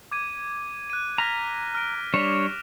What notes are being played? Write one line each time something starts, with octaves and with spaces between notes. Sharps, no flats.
D6 G#6 D#7
F#6 D#7
A#5 F6 A#6 B6
F6 D7
G3 D4 C#5 E7 F7